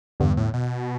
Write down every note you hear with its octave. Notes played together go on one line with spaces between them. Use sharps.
E2 G2 D3 G3 B3
A2
B2